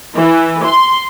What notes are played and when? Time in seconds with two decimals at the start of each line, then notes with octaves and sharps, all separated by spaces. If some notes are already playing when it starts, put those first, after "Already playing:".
0.16 E3
0.63 C6